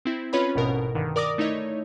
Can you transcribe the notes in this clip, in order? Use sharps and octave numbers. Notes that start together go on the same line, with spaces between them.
C4 E4
C#4 F4 B4 C#5 D#5 B5
A1 G#2 B2 A#4
G2 D3 D#3
A#4 D5 D6 D#6 A#6
A3 D#4 E4 C#5 D#5